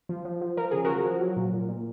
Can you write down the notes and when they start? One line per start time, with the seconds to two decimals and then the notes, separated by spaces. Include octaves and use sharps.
0.09 F3
0.25 F3
0.41 F3
0.57 F3 A#4
0.71 C#3 G#4
0.85 F3 F#4 A#4
1.05 F3
1.21 F#3
1.37 A#2
1.53 A#2
1.69 A#2